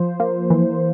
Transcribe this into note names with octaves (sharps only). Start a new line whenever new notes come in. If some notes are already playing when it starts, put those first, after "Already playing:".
Already playing: F3 C5
A#3
E3